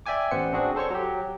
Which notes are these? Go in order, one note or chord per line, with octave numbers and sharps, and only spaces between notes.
D5 E5 G5 G#5 D6
A1 B3 C5 F#5 C#7
C4 D4 F#4 G#4
A4 C5 C#5 C#6
F#3 G4